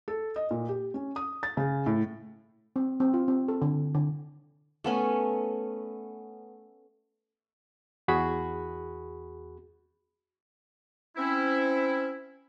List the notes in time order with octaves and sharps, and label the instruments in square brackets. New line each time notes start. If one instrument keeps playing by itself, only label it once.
[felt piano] A4
D#5
A#2
G4
C#4
D#6
A6
C#3
A2
[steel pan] C4
C4
F4
C4
A4
D3
D3
[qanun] A3 B3 C#4
[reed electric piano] E2 F#4 G#4 B5 F#6
[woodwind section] C4 C#4 E4